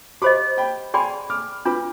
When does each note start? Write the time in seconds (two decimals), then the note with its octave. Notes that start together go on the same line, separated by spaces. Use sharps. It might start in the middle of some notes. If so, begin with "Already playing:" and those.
0.22 G4 C5 D#5 B5 D6
0.58 G5 B5
0.94 G#4 D5 G5 G#5 B5 C6
1.30 D6 F6
1.65 D4 F4 B4 B5 D6